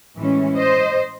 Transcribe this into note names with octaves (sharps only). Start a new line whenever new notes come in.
A2 E3 G#3 C#4
C5 D#5